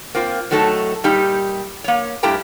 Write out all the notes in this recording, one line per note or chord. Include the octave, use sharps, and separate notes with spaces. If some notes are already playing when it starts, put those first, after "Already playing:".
A#3 C4 F4
A2 F#3 A3 D#4 A4
A#2 G3 D#4 G4
A#3 C#5
G2 A3 E4 G4 G5 A#5